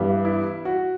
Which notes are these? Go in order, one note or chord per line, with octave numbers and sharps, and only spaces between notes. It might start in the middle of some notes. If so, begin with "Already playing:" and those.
Already playing: G2 E3 G3 B3 G4
E4
F#4